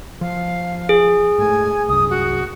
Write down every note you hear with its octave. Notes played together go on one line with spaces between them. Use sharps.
F3 F5
G#4
G#2 A3 G#5
C2 F#2 D#6
F#4